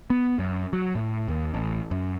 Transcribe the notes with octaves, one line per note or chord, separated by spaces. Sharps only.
B3
F#2
F#3
A2
D#2
A1
F#2